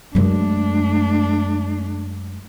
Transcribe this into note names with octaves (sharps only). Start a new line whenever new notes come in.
F#2 G#3 A3 D4